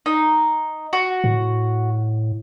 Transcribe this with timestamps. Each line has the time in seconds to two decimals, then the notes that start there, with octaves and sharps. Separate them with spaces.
0.06 D#4
0.93 F#4
1.24 A2